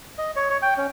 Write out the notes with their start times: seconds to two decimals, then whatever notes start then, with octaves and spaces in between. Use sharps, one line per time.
0.18 D#5
0.36 C#5
0.50 C#5
0.62 G5
0.78 C#4